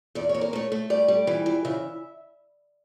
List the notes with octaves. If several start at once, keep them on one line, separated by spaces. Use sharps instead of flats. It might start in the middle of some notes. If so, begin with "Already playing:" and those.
E2 D5
C#5
A#3
A#4
A3 C#5
A3
G3 D5
G3
E3
E3
C#3 E5